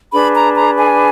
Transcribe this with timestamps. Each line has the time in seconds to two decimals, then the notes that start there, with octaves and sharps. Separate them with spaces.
0.12 D4 G#4 B4 B5
0.34 A#5
0.56 A#5
0.78 G#5